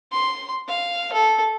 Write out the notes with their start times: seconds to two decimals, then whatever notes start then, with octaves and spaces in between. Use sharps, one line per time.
0.11 C6
0.68 F5
1.13 A4